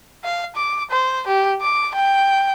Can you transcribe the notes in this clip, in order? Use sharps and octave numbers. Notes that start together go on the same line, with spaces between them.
F5
D6
C5
G4
D6
G5